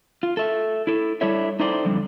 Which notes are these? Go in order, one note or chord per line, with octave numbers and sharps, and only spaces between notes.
F4
A4 E5
E4 A4
G3 D4 E4 A4 C#5 E5
D#4 E4 A4 C5 D5 G5
F2 D3 G3